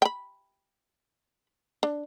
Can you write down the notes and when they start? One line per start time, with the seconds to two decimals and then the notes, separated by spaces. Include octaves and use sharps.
0.02 G5 B5
1.83 D4